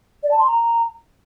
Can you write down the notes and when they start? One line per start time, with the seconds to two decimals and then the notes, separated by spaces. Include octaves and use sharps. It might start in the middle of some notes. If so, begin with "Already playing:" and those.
0.23 D5
0.31 A5
0.39 C6
0.47 A#5